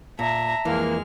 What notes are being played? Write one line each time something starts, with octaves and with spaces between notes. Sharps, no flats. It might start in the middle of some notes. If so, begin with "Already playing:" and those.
A#2 E5 A5 A#5
F2 E3 G#3 A#3 F6